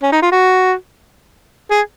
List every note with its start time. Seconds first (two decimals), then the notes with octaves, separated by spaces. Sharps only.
0.03 C#4
0.12 D#4
0.22 F4
0.32 F#4
1.71 G#4